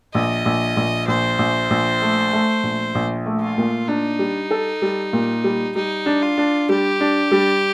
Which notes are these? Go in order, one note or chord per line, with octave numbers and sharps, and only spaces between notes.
A#1 D#5
A#1
A#1
A#1 C5
A#1
A#1
A3
A3
A#1
A#1
A3
F4
A#2
D4 D#4
G3
A4
G3
A#2
G3
G3 D#4
D4
F4
D4
G3 G4
D4
G3